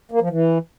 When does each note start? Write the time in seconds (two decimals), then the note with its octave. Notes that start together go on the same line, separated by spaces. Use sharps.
0.11 A#3
0.21 F3
0.30 E3